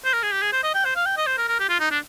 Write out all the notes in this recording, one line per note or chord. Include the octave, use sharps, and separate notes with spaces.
C5
A#4
G#4
G4
G#4
C5
D#5
G5
C5
F5
G5
D#5
C5
A#4
A#4
G4
F4
D#4
D4